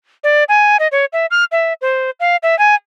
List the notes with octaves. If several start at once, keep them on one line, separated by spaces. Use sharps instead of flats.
D5
G#5
D#5
C#5
E5
F6
E5
C5
F5
E5
G#5